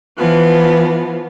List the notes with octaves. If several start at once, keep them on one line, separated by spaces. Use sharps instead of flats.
E3 F3 B3